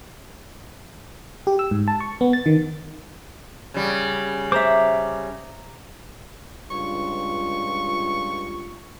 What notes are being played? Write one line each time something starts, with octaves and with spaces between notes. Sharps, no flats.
G4
E6
G#2
A5
C#6
B3
A6
D#3
C#3 G3
C5 E5 A#5 D6
C#2 G2 F4 C#6